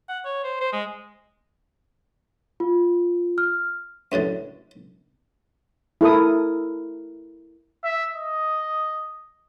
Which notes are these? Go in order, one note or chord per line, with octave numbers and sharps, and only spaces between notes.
F#5
C#5
C5
C5
G#3
F4
F6
C#2 F#2 A2 D3
E4 A4 A#4 D#6
E5
D#5